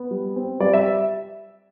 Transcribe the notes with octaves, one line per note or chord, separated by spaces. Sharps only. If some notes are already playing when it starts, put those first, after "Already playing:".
Already playing: B3
G3
C4
G3 D5
E5